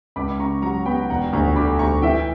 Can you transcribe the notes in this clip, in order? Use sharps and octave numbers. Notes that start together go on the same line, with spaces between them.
C#2 B5 D6
C#3 A#5 C#6
F#3 A#5 C#6
B3 G5 B5
E1 F#5 A#5
D2 A#5 C#6
D3 B5 D6
D2 A#5 C#6
E3 E5 G5